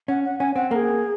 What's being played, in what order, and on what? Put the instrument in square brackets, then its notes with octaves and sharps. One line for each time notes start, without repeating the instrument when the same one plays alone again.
[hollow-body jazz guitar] C#4 [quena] F#5
[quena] F#5
[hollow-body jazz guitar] C#4 [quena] G#5
[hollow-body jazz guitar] C4 [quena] F#5
[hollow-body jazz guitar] A#3 [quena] A#4
[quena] G#4